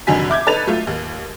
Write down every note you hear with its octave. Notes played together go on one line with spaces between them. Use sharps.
F1 D3 D#3 F#3 G#5 B6
E5 D6 G6 G#6
D#4 A4 B4 A6 F7
F#3 A3 F4
D#2